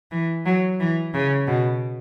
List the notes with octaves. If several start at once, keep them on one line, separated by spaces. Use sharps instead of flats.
E3
F#3
E3
C#3
B2